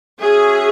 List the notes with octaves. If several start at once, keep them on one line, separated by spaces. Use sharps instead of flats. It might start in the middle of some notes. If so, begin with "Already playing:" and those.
C#4 F#4 G#4 E5